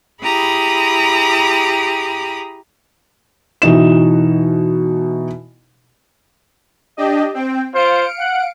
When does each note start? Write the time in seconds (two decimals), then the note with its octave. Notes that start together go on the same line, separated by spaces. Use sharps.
0.21 E4 G4 G#4 A#5 B5 D#6
3.62 B2 E3 D#4 E7
6.97 D4 G4 D#5
7.34 C4 G5
7.75 F4 C5 F5 C#7 D7
8.19 F#5